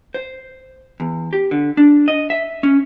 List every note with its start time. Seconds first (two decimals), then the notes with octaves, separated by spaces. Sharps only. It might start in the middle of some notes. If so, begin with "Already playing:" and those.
0.14 C5
1.00 E2
1.33 G4
1.51 D3
1.77 D4
2.08 D#5
2.30 E5
2.63 C#4